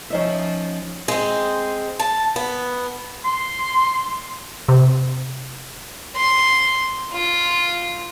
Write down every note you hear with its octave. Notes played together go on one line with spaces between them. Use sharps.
F3 C#4 D#4 E5
G#3 C4
A5
B3
C6
C3
C6
F4